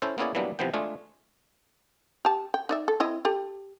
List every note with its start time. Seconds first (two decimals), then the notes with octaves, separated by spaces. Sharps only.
0.02 C#4 E4 A4 C5
0.18 A#3 B3 C#4 E4 G#4 D5
0.35 E3 F#3 G3 A#3 B3 D4
0.59 C3 E3 F3 B3 G5
0.73 G#3 A3 D4 F4 G#4
2.25 G4 A5
2.54 G5
2.69 D#4 D5 E5
2.88 A4
3.00 C4 E4 D#5
3.25 G4 A4